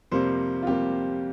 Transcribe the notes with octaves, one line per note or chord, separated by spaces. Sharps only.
F2 C3 G3 A#3 C5
F4
F2 C3 G3 A#3 G4